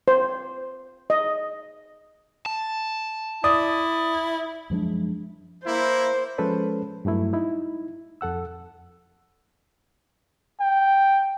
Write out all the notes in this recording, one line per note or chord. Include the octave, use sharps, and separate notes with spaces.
C5
D#5
A5
E4 D5 D#6
F#2 F3 G#3 D4
A#3 E4 C5
F3 G#3 C#4 A4 B4 C5
G2 F#3 A3 E4
D#4 E4
F2 A4 F#5 E6
G5